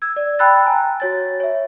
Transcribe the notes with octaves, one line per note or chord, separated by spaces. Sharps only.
E6 G#6
D5
G5 A5 B5 E6 F#6 A6
G5 G#5 A#5
F#4 C#5 A6
C#5 E5